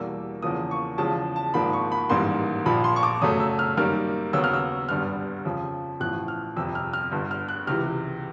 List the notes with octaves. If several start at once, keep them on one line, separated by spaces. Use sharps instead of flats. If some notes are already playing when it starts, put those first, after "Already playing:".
Already playing: E2 B2 G3 A#3 E6
E2 C#3 F3 A#3 D#6
C#6
E2 C#3 F3 G#3 A5
A5
G#1 G#2 F3 A#3 B5
C#6
B5
A1 G#2 D#3 G3 A#3 C6
A#1 A#2 F3 B5
C6
C#6
D6
F#2 C#3 F#3 A3 D#6
E6
F6
F#2 D#3 G3 A#3 F6
D#2 C#3 F#3 B3 E6
F6
E6
G#1 G2 D3 G3 B3 F6
F2 C#3 F3
A1 A2 F3 F#6
F6
G1 F2 C3 E6
F6
F6
G1 G2 D3
F6
F#6
C#2 C3 E3 F6